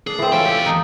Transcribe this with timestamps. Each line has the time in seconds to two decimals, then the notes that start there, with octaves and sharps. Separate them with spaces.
0.07 D4 G#4
0.19 E3 C4
0.32 E2 C#4 F4 A4 G5
0.45 G4 A4
0.66 D#4